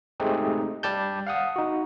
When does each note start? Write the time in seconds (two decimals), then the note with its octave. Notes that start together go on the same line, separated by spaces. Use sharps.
0.20 G#3 A3 C4 D#4 G4 G#4
0.83 G3 G4 A5 G6
1.27 F5 F#5 D#6
1.56 D#4 F#4